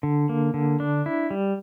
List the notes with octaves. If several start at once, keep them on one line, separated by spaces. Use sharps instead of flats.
D3
A#3
D3
D4
E4
G3